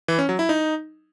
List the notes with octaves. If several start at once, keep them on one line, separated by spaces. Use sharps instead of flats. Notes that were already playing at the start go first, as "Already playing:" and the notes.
E3
C#4
F#3
E4
D#4